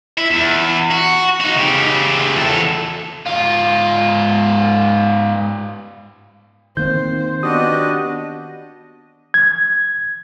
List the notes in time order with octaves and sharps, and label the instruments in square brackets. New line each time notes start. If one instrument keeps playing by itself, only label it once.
[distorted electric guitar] E4
E2
F#4
D#4 F#4
C#3 G4
E2 A4
[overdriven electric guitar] G#2 F4
[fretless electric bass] D#3 A#3 C4 [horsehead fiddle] C5 [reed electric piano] G6
[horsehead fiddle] B3 D#5 [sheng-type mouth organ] D4 F#4 G4 [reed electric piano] D#6
[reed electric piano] G#6